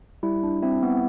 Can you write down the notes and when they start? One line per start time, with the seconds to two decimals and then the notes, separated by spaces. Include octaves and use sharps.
0.23 G3 E4
0.43 D4
0.62 C4 E4
0.83 B3